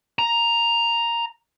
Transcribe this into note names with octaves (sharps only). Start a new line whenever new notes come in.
A#5